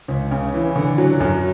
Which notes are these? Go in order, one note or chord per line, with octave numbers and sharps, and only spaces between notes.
C#2
C#3
E3
D3
F#3
F#2